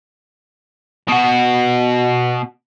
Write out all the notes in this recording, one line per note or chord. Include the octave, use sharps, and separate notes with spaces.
B2 F#4